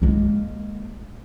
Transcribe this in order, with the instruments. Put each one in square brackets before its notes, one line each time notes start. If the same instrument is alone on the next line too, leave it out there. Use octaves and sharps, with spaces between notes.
[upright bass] G#3 A#3